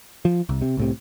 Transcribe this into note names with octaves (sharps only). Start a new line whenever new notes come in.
F3
C2
C3
C2 A2 C3